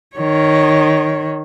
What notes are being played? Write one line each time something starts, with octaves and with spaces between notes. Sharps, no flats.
D#3 C#5